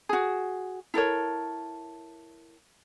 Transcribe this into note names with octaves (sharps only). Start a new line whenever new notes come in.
F#4 G#4
E4 A4 A#4 C#5